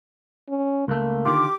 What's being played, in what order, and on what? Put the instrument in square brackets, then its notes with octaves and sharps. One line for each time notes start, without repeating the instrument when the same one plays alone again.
[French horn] C#4
[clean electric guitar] C#2 A3 [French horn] A#3
[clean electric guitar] D3 D#3 F4 [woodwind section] G4 D6